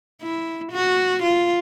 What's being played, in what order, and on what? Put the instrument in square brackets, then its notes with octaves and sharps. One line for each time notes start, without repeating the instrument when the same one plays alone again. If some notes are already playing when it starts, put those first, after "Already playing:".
[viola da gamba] E4
F#4
F4